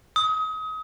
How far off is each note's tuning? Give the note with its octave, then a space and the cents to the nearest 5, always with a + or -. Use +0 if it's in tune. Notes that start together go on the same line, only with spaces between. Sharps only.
D#6 +30